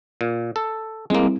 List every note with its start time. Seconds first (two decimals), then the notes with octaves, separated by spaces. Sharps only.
0.21 A#2
0.56 A4
1.10 G3 G#3 A#3 C4 E4